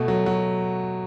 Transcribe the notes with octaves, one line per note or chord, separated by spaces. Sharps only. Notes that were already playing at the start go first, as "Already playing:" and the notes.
Already playing: B2 A3
F#3
F#3